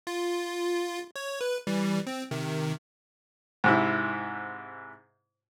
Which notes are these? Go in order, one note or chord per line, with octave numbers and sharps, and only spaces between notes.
F4
C#5
B4
E3 G3
C4
C3 D#3
G#2 C3 E4